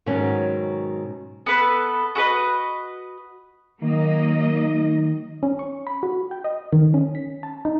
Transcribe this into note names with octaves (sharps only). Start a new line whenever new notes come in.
G#2 B2 D#3 F#3 B3 C#4
B3 A4 B4
F#4 A4 B4 D#5
D#3 F#3 A#3 D#5
C#4
C#6
B5
F#4
G5
D#5
D#3
C#4
B6
A5
D#4